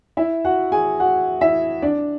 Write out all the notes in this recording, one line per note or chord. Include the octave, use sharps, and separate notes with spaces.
E4 E5
F#4 F#5
G#4 G#5
F#4 F#5
E4 E5
D4 D5